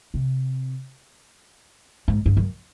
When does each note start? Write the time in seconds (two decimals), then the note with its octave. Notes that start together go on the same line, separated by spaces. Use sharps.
0.14 C3
2.08 G#2
2.26 G2
2.37 F#2